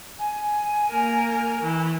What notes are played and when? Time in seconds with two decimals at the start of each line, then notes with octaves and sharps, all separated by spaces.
0.19 G#5
0.90 A#3 A#4
1.63 E3